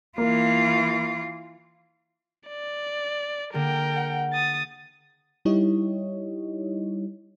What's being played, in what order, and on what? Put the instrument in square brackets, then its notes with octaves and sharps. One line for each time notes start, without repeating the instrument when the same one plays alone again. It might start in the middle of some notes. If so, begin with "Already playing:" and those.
[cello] E3 F4 [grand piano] A#3
[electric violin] D5
[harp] D3 A#3 G#4 [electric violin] A#4 G5
[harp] F#5
[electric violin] D#6 A6
[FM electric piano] G3 D#4 E4 G4 C#5 D#5